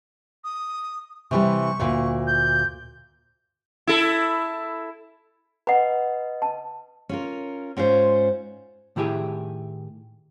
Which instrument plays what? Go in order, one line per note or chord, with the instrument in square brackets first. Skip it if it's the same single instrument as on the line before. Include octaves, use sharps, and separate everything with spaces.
[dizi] D#6
[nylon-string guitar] C3 E3 G3 [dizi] C#6
[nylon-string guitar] D2 A#2
[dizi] G6
[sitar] E4 A4
[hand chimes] B4 D#5 [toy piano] F#5 A#5
[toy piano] A5
[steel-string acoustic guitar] C#4 F4 A#4
G#2 C#4 F4 C5
[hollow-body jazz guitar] A2 D#3 E4 G4 G#4